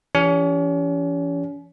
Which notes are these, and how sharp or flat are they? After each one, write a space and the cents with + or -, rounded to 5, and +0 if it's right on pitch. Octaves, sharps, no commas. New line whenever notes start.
E3 +40 C#4 +40 G4 +15